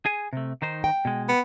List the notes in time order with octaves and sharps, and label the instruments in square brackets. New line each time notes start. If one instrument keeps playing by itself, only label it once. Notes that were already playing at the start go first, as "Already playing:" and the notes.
[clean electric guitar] G#4 G#5
C3 A3
D#3 D#4 C5
[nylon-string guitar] G5
[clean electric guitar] B2 G#3
[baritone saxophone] B3